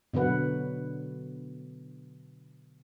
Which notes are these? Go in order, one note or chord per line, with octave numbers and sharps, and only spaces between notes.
B2 D3 F#3 B4 F#5